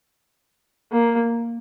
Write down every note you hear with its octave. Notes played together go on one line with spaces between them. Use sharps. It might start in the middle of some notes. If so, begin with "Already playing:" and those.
A#3